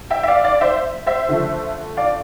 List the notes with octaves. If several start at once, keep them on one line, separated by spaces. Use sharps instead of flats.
E5 G5
E5
D5 F5
D5 F5
D5
C5 E5
C5 E5
D3 F3 A3
D5 F5